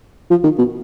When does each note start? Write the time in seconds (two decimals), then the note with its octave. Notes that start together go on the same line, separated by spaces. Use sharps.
0.30 F3
0.44 D#3
0.58 B2